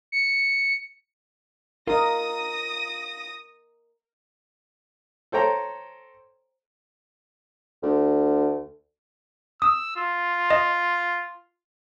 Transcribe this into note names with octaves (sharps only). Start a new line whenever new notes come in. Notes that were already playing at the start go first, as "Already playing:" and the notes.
C#7
F4 A#4 D#5 D#6 A#6
A4 C5 C#5 G5 A#5
D2
D#6 E6
F4
D#5